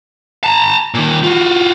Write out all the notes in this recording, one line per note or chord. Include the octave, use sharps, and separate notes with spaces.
A5 A#5
A#2 D#3
F4 F#4